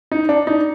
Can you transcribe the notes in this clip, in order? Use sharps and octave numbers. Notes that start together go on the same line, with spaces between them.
D#4
D4
D#4